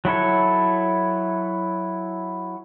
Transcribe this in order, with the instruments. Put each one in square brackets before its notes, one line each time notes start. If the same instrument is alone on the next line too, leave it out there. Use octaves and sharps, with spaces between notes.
[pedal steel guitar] F#3 E4 A4 C#5